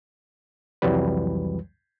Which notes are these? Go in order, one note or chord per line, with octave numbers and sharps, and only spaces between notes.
C2 F2 E3 F#3 G3 B4